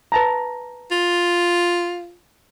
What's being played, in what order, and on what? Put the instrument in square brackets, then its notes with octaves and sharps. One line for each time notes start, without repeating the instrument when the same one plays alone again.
[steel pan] B4 A5 A#5
[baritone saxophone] F4